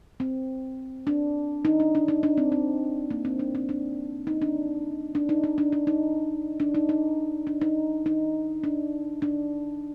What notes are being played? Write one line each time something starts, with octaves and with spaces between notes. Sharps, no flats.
C4
D4
D#4
D4
D4
D#4
D4
C4
C4
A#3
C4
D4
C4
D4
D#4
D4
D4
D#4
D#4
D4
D4
D#4
D4
D#4
D#4
D4
D#4
D#4
D4
D4